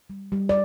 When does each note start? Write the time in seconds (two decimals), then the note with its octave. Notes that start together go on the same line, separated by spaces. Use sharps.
0.10 G3
0.32 G3
0.49 D5